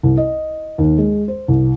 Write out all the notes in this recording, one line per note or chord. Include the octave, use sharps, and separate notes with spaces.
C2
D#5
D#2
G#3
C5
C2